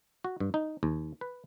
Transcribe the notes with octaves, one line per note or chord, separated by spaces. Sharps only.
F#4
G2
D#4
D#2
B4